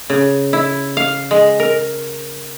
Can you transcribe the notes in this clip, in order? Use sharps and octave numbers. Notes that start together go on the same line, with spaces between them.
C#3
E4
F5
G#3
A#4